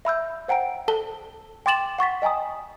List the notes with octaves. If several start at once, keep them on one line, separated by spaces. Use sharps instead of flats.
E5 B5 E6 G6
C5 F#5 G5 A#5 D7
A4 A5 G7
G5 C6 D6 A6 E7 F#7
F#5 C#6 A6 B6
D#5 G5 G#5 A#5 D#6